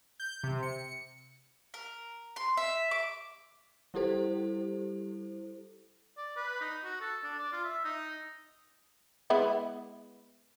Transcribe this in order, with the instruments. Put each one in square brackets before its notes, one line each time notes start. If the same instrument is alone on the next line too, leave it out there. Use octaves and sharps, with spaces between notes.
[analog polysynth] G6
C3
C#7
[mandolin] A#4
C6
E5
D6
[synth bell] G3 E4 G4 A4 C5
[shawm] D5
B4
D#4
F#4
A4
D4
D5
F4
E5
D#4
[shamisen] G#3 B3 E4